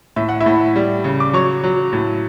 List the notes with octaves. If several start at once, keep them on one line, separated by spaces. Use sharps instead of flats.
A2 E5
F#5
E4 E5
A2
G3
C#3
D6
F#3 C#5 C#6
F#3
A2